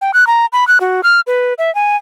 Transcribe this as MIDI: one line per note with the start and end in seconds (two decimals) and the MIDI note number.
0.01 0.11 79
0.14 0.27 90
0.27 0.46 82
0.53 0.67 83
0.68 0.78 90
0.80 1.01 66
1.03 1.20 89
1.27 1.54 71
1.58 1.73 76
1.75 1.96 80